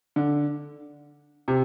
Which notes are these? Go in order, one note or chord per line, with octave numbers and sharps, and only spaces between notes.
D3
C3